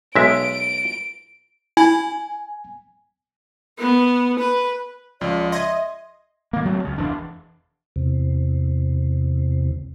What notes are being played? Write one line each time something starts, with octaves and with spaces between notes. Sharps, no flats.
B1 G#3 E5 D7
E4 G#5
B3
B4
C#2 F3 D5
D#5 E5 C6 G#6
D#3 A#3
D2 F#3 A3 C4
C#2 C#3
E1 E3 D4
E2 C3